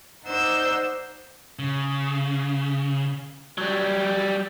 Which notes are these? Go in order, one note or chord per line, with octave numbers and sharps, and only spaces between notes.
D#4 C5 D5 F#5 E6 G6
C#3
F#3 G3